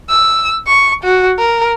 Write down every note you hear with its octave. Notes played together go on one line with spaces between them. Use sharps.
E6
C#6
F#4
A#4